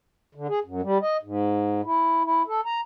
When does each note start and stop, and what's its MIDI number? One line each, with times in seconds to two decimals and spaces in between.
0.35 0.47 50
0.49 0.59 68
0.64 0.81 42
0.82 0.98 55
1.02 1.17 75
1.23 1.81 44
1.84 2.23 64
2.24 2.42 64
2.48 2.61 69
2.66 2.81 82